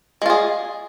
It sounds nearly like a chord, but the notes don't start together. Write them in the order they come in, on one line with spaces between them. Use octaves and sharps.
G#3 F4 G#4